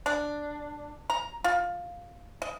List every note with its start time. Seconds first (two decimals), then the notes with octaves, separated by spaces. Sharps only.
0.06 D4
1.10 A#5
1.44 F4
2.42 D#5